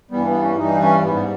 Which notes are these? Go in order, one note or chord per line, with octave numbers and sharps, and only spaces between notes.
G2 E3 G3 B3
B3
C#4
G2 E3 G3 D#4
C#4
G#2 G3 B3